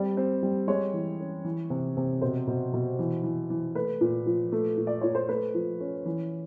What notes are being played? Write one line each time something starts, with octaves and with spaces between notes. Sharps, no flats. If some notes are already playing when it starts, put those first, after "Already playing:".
Already playing: G3 C4 D5
C4
G3
G#3 C#5
E3
C#4
E3
C3
C3
B2 C5
B2
B2
E3
E3
E3
A3 B4
A#2
F3
A3
A#2
D5
A#2 C#5
C5
A3 B4
F3
C#4
E3